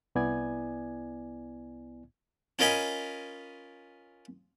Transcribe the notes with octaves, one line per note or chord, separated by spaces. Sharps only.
C2 B3 E4 D5 G#5 G#6
C#4 F4 A#4 D#5 G#5 B5